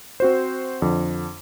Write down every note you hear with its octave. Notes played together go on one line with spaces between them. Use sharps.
C4 F#4 C5
F2 D3